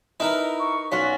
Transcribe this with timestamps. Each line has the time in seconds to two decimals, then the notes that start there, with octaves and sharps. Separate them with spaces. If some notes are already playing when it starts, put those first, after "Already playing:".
0.20 D#4 E4 A#4 B4
0.60 C#6
0.92 B1 C#4 F4 F#4 B6